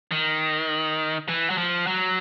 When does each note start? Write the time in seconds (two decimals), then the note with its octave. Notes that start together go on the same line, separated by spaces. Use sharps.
0.11 D#3
1.28 E3
1.50 F#3
1.58 F3
1.87 F#3